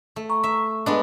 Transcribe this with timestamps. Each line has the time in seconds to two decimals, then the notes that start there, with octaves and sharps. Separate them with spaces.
0.16 A3
0.29 A#5 C#6
0.44 E5
0.86 G#3 B3 D4 D#5